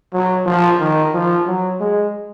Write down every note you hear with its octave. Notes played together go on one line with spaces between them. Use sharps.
F#3
F3
D#3
F3
F#3
G#3